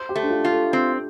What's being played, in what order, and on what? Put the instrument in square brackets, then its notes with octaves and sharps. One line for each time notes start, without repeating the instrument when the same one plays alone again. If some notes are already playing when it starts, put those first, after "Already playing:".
Already playing: [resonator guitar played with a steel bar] C5
[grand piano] G4
[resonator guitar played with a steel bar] A3
[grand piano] D4
F4
[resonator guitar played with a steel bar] F4
[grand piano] A4
[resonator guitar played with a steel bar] C4